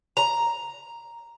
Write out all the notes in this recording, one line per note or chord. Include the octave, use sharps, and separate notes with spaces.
A#5